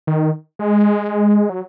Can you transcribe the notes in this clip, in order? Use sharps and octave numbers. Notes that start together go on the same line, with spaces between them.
D#3
G#3
F#3